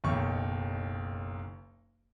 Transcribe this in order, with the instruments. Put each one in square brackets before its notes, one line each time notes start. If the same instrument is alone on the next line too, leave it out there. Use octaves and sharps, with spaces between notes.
[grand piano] F#1 B1 D#3 C#6